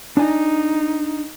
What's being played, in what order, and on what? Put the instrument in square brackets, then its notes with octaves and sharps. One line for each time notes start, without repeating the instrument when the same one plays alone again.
[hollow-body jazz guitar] D4 G#5 [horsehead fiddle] D#4